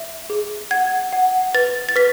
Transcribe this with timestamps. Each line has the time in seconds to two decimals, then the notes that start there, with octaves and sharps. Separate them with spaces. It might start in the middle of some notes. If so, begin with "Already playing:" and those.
Already playing: E5
0.30 G#4
0.71 F#5 G#6
1.13 F#5
1.54 B4 A6
1.89 A6
1.96 B4 B6